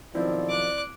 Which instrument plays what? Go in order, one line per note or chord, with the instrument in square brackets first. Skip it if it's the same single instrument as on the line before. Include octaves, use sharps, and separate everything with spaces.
[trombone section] B1 D#3 F3 [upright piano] C4 E4 [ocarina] D5
[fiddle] D6 F#6